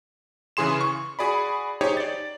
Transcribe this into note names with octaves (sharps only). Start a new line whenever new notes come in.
C#3 E3 G#4 C6 E7
C#6
F#4 G#4 D5 B5
D#4 G4 G#4 C5 C#5
D5 A6